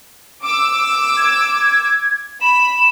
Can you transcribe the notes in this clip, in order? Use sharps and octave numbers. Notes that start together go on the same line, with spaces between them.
D6 E6
G#6
B5 E7